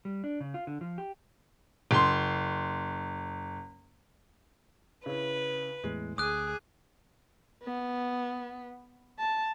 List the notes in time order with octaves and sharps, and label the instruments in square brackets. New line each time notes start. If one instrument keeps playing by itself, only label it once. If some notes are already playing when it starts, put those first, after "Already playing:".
[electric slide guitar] G3
D4
C#3
F4
D3
F3
G4
[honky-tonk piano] F#1 C6
[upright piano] C#3 E4 [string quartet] B4
[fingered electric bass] E2 A2 [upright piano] G#3
[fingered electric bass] D2 [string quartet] G#4 [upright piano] D6 [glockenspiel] D#6 F#6
[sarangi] B3
A5